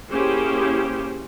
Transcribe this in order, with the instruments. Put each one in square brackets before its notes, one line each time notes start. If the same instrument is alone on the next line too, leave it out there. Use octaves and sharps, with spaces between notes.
[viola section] A#3 C#4 E4 G4 G#4 C5